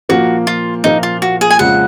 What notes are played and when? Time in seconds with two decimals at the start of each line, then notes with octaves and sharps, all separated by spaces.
0.09 A#2 F3 A#3 F#4
0.47 F4
0.84 A#2 F3 A#3 D#4
1.03 F4
1.22 F#4
1.41 G#4
1.51 G#5
1.59 F2 C#3 F3 G#3 F#5